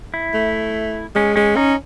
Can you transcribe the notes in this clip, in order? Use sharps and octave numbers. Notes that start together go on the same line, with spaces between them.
E4
A3
G#3 C#4
G#3 C#4
C#4 D#4